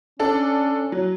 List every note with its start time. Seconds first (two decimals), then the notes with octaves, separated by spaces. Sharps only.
0.19 C#4 D4 A4 D5
0.92 F#3